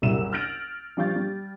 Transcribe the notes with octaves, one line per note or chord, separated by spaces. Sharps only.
F#1 C2 G3 E4 E6 E7
F6 G6 A6 A#6 D7 F#7
F3 G3 F5 C#6 G6 A6
G3